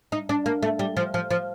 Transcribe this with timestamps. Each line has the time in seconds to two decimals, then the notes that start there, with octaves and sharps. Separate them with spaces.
0.12 D#4
0.29 D4
0.46 A#3
0.63 A3
0.79 G3
0.97 F3
1.14 F3
1.31 F3